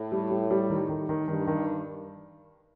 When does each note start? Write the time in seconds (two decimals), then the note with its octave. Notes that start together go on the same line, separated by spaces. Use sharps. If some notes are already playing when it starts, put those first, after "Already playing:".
Already playing: A2
0.12 G3
0.30 G3
0.51 G3
0.70 D#3
0.89 D#3
1.09 D#3
1.28 G2 D#3
1.47 D#3